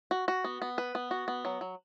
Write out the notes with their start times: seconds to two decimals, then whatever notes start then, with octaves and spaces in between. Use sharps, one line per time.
0.11 F#4
0.28 F#4
0.44 B3
0.62 B3
0.78 B4
0.95 B3
1.11 F#4
1.28 B3
1.45 F#3
1.61 F#3